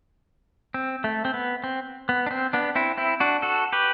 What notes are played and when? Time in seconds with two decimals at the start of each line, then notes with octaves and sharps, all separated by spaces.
0.74 C4
1.04 A3
1.25 C4
1.34 B3
1.64 C4
2.09 B3
2.26 D4
2.31 C4
2.53 B3 D4
2.76 C4 E4
2.98 C4 E4
3.20 D4 F#4
3.42 F#4 A4
3.73 G4 B4